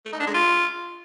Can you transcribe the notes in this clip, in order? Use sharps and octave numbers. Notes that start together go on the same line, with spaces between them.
A3
D#4
D4
G#3
F4